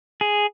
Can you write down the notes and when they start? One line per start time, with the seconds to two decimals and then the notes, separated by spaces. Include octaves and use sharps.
0.21 G#4